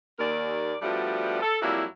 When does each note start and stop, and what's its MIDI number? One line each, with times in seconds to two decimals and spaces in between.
0.19 0.75 39
0.19 0.75 70
0.19 0.75 74
0.82 1.39 53
0.82 1.39 55
0.82 1.39 57
0.82 1.39 59
0.82 1.39 62
0.82 1.39 66
1.42 1.58 69
1.62 1.85 41
1.62 1.85 54
1.62 1.85 55
1.62 1.85 58
1.62 1.85 64